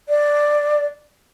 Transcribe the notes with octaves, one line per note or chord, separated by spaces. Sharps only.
D5